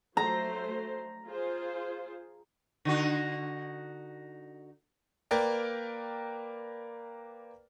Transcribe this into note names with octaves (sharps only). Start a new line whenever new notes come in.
F#3 A3 C5 A#5
F4 G#4 C5
D3 D#4 F#4
A#3 A#4 B4 D5 G5